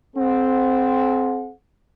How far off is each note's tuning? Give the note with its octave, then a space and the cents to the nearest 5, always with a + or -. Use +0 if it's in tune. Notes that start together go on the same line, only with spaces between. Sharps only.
C4 +0 G#4 +45 F#5 -30